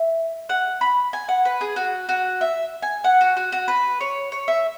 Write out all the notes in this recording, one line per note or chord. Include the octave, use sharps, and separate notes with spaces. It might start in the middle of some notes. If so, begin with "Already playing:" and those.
Already playing: E5
F#5
B5
G#5
F#5
B4
G#4
F#4
F#4
E5
G#5
F#5
F#4
F#4
F#4
B4
C#5
C#5
E5